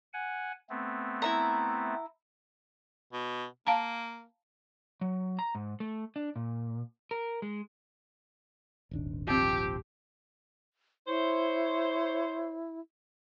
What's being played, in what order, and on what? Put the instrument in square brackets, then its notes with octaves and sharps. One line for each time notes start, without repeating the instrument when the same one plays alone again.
[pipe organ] F#5 G#5
A3 B3 C4
[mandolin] E4 E5 A#5
[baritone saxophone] B2
[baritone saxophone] A#3 [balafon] F5 A5 A#5
[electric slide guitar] F#3
A#5
G#2
A3
D4
A#2
A#4
G#3
[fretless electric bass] D#1 G#1 D4
[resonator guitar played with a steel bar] F3 C4 [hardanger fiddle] G4
[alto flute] E4 [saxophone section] C5 C#5